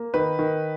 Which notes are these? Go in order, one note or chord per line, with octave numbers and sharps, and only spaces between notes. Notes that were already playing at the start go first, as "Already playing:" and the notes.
Already playing: A#3
D#3 B4
D#3